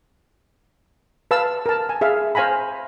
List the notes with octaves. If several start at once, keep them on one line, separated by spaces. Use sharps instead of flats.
B4 F5 A5 E6
A#4 A5
G#5
G#4 E5 F5
C5 F5 G#5 A#5 B5